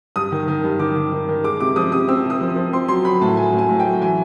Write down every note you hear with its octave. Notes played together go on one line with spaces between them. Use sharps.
G2 D#6
D#3
D#3
G2
D#3 D6
D#3
D#3
D#3
G#3 D6
C3 D6
F3 D#6
C3 D#6
C4 E6
C3
D#6
F3
F3
C4 C6
F#3 C6
F#3 B5
A2 A5
F#3 G#5
A2
G#5
A2
G5
F#3
E3 G#5